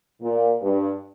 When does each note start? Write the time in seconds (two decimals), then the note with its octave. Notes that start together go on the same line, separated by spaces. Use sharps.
0.21 A#2
0.61 G2